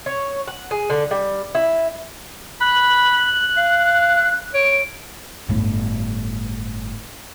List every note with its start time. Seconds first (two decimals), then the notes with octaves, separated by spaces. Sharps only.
0.06 C#5
0.48 F#5
0.71 G#4
0.90 D3
1.11 G3
1.55 E4
2.61 B5 F#6
3.57 F5
4.54 C#5 D7
5.48 G1 A2